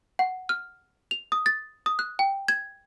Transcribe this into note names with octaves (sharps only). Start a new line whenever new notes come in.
F#5
F6
F7
D#6
A6
D#6
F#6
G5
G#6